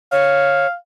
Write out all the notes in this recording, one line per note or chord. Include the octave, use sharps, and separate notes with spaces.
C#5 F5